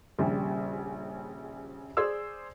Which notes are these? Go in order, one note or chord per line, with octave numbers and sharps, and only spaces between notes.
D#1 A#1 C#3 G3
G#4 C5 D5 E6